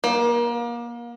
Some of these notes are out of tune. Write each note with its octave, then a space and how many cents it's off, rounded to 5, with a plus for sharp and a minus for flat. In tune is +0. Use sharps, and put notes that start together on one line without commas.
A#3 +30